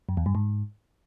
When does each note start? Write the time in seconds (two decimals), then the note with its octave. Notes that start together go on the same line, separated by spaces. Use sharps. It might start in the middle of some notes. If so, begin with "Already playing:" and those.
0.09 F#2
0.17 E2
0.26 G2
0.35 G#2